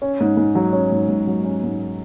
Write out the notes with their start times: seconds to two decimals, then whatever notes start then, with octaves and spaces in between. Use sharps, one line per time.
0.02 C#4
0.20 G#2
0.37 G#2
0.55 F#3
0.73 C#4
0.92 G#2
1.09 G#2
1.27 F#3
1.44 C#4
1.63 G#2